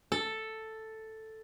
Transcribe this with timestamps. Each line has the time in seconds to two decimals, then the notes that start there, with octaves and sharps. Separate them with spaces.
0.12 A4